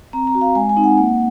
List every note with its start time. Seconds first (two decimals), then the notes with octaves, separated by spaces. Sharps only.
0.13 C4 A#5
0.27 A#5
0.35 F#4
0.41 F5
0.55 G#3 G#5
0.69 G#5
0.77 C4 D#4
0.84 F#5
0.97 A#3 F#5